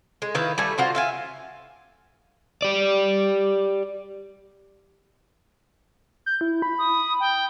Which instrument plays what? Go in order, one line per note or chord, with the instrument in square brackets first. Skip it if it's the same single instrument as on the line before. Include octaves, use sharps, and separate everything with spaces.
[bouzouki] G#3
D#3 E4 B4 F5
G3 A3 G#5
F4 F#4 C5
E5 F5 G#5
[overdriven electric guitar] G4 D5
[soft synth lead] G6
E4
B5
[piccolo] D#6
G5